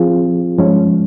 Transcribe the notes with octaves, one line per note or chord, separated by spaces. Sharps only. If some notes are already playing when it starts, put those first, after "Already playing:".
Already playing: F3 C4 F4 G#4
G2 F3 G#3 C#4